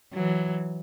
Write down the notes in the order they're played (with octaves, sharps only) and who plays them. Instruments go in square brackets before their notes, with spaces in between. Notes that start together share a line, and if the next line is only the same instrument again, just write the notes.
[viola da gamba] E3 F#3